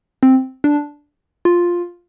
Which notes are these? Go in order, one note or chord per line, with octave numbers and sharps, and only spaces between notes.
C4
D4
F4